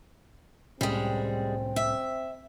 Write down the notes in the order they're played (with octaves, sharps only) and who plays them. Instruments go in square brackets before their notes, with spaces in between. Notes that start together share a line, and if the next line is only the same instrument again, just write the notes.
[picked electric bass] C2 A2 C#4 [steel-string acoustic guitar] G3 G#3 [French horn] C4
[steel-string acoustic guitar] E5